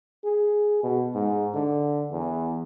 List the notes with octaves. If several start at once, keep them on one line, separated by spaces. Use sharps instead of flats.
G#4
B2
G#2
D3
E2